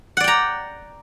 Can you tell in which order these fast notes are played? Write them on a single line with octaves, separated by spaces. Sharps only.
F#5 D5 G5 A#5